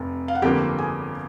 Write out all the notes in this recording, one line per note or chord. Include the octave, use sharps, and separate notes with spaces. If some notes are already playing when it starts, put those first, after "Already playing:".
Already playing: F1 C3
F5
F#5
G1 F2 D3 F3 A#3 G4 G5
G#4 G#5